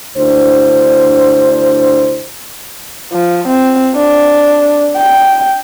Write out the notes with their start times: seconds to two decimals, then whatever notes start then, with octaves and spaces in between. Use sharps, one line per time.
0.17 D2 D4 E4 C5
3.13 F3
3.47 C4
3.96 D4
4.97 G5